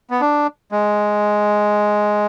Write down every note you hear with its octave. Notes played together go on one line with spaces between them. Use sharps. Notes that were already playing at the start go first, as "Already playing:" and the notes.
B3
D4
G#3